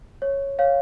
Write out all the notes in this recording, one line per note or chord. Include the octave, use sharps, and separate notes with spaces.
C#5
C#5 F5